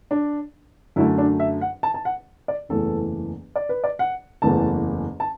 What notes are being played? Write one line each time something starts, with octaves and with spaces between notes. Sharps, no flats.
D4
F#2 D3 A3 E4
D4
E5
F#5
A5
A5
F#5
D5
F#1 E2 E3 A3 A4
D5
B4
D5
F#5
F#1 E2 E3 A3 A5
A5